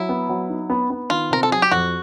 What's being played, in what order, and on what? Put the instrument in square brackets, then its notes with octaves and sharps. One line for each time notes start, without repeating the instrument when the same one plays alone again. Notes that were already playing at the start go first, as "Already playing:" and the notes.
Already playing: [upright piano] F#3 [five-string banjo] E4
[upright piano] B3
F#3
D#4
B3
B3
[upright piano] D#3 [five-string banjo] F4
[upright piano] C3 [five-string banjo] A#4
[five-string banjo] A4
[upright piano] F#3 [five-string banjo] G#4
[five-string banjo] G4
[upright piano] F2 [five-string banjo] F#4